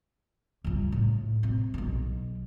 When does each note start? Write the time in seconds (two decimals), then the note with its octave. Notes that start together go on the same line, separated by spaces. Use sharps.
0.64 C#2 G2
0.92 A2
1.43 C3
1.74 B1 B2